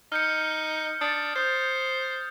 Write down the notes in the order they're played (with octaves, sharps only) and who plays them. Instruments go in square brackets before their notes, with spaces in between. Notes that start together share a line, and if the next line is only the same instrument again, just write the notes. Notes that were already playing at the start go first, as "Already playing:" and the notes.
[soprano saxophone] D#4 [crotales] F6 G6 C#7
[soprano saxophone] D4 [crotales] D#6 A6 C#7
[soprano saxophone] C5 [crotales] D#6 G6